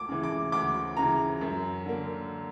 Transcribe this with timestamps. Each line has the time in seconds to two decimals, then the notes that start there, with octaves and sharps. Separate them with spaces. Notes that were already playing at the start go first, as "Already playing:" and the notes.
Already playing: D2 D6
0.09 C#3 E3
0.23 D6
0.52 D2 D6
0.97 C#3 E3 A#5
1.41 F#2
1.86 D3 A#3